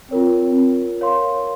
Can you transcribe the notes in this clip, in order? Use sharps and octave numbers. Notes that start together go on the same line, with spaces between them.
C4 F4 A#4 C#5
A#4 C#5 F5 C6